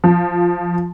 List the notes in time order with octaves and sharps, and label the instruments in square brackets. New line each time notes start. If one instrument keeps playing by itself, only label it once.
[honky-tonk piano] F3